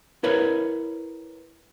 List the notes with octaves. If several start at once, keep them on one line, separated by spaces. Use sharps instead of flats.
E4 A#4 B4 C#5